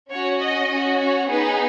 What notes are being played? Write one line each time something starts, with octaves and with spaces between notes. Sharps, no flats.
C#4 F#4 C#5
D#5
C#4 F#4
C#5
B3 D#4 G#4 B4